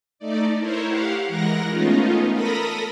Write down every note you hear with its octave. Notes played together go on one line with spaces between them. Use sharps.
A3 D#4 D5
E4 A#4 C5 C#5
G4 F5 F#5
E3 G#3 A#4 F#5 A#6
A3 B3 C#4 D#4 F4
A4 A#4 B5 D#6 A#6